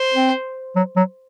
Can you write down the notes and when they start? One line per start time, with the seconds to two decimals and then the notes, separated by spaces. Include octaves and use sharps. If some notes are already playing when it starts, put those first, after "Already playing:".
Already playing: C5
0.14 C4
0.76 F#3
0.96 F#3